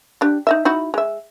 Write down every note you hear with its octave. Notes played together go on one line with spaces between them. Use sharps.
D4 G4
D#4 D#5 E5
D#4 E4 F#4
G#3 E5